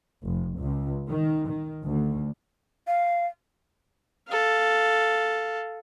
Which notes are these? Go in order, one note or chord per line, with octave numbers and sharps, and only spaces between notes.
F1
C#2
D#3
D#3
D2
F5
A4 F5